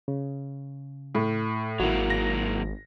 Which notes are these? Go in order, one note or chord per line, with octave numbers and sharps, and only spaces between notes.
C#3
A2
G#1 F#3 A#3 E4 F#4
A#6